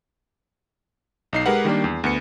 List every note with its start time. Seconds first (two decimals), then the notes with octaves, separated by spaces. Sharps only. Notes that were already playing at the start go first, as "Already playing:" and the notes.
1.33 B1 D#4 C7
1.46 G#3 G4 A#4 B4 F#5
1.65 D#3 G3 A#3 D4
1.84 E2
2.04 D2 B3 C#7